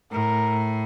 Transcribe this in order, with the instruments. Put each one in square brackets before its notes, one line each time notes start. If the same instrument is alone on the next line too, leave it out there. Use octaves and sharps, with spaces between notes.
[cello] A2 [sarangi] A#4